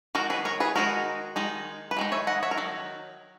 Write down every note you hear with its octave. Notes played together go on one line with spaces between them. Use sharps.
D#3 G#3 D#4 F#4 A#4
G#4 B4
A#4 C#5
G#4 B4
D#3 G#3 D#4 F#4 A#4
D#3 G#3 D#4
B4
D#3 G#3 D#4
C#5 E5
D#5 F#5
C#5 E5
A#4
D#3 F#3